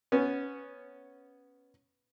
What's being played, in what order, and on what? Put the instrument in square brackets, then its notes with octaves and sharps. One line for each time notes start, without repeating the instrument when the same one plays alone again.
[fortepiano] B3 C#4